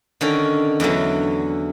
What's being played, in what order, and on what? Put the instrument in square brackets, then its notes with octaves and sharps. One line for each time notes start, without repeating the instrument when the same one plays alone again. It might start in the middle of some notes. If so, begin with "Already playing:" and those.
[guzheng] D3 D#3 C#4
E2 D3 E3 F#3